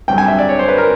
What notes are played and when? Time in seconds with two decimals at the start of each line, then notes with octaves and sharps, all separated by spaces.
0.08 G2 D3 F#3 G5
0.18 G#5
0.28 E5
0.39 D5
0.49 C#5
0.59 C5
0.68 B4
0.78 A#4